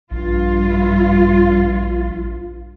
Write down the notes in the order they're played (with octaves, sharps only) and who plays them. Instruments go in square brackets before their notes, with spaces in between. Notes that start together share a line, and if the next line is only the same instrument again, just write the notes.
[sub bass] A#1 [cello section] G2 F4